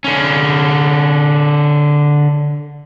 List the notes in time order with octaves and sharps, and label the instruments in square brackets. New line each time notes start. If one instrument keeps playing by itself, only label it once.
[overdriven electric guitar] D3 C#4